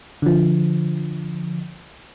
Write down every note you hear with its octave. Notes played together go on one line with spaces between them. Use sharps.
D3 F3